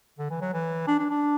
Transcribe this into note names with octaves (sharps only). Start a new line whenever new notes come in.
D3
E3
F#3
E3
D4
D4
D4